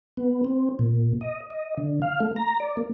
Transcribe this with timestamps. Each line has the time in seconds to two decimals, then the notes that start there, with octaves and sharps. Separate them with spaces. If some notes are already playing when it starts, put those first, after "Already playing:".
0.17 B3
0.44 C4
0.79 A#2
1.21 D#5
1.50 D#5
1.78 D3
2.02 F5
2.20 A3
2.36 A#5
2.60 D5
2.77 A#3